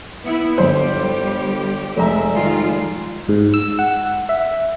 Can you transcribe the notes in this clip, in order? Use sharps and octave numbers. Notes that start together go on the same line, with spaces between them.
B3 E4
G1 G3 G4 C5
F1 G#3 E5 A#5
D#3 G3 F4
G#2
E6
F#5
E5